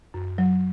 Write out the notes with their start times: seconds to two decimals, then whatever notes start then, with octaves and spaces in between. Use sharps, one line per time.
0.14 F#2
0.38 F#3